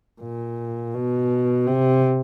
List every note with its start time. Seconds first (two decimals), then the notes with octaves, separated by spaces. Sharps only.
0.22 A#2
0.94 B2
1.67 C3